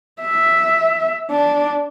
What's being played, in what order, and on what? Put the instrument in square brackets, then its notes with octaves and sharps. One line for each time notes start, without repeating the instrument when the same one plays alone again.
[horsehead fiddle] E5
D4